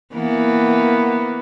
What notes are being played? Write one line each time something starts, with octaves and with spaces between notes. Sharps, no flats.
E3 A#3 B3